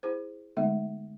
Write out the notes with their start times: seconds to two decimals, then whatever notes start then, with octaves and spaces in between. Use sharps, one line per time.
0.03 E4 G#4 C5
0.57 D3 G#3 A3 B3 D#4 E5